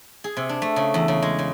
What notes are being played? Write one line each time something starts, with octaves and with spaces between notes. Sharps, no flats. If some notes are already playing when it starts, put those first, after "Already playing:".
G#4
C3
D4
A3
C#3
E2
C#3
G#3
C#3